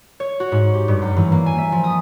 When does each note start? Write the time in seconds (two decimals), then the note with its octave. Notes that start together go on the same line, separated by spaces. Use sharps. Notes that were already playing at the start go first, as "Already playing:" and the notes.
0.20 C#5
0.40 F#4
0.52 G#2
0.73 G4
0.88 G2
1.02 F#2
1.17 E3
1.32 A#3
1.46 G#5
1.58 E5
1.72 F3
1.84 D#6